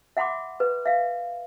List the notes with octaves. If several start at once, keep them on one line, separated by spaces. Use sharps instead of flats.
E5 F#5 B5 C6 D6
B4
E5 F5